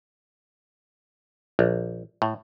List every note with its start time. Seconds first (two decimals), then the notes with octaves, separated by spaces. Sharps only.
1.59 A#1
2.22 A2